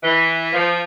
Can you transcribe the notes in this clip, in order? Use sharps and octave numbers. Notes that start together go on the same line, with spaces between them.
E3
F3